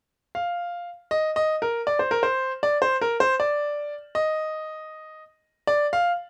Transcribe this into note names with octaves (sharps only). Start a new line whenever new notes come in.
F5
D#5
D#5
A#4
D5
C5
A#4
C5
D5
C5
A#4
C5
D5
D#5
D5
F5